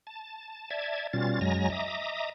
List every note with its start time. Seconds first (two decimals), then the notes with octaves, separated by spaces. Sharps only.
0.07 A5
0.70 D5 E5 A5 G#6
1.13 B2 G3 C#4 F4 A6
1.41 F#2 F#3 G#3 G#5 A#5 A#6
1.70 D#5 E5 A#5 D6 D#6